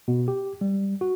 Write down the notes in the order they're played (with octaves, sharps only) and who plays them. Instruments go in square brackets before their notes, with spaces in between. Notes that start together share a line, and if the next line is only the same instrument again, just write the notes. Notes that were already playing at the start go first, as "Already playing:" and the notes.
[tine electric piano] B2
G4
G3
F#4